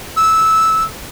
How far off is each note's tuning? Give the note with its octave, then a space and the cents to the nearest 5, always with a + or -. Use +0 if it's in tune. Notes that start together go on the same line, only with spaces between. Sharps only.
E6 -15